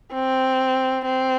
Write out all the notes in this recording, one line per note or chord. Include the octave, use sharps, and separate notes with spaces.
C4
C4